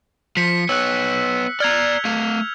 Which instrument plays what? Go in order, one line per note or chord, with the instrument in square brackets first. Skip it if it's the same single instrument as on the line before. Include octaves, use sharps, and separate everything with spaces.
[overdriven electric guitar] F3 [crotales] B6 C#7
[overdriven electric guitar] B3 C#5 [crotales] E6 F#6
[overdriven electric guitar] D5 A#5 [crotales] F6 G#6 F7
[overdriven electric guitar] A3 F5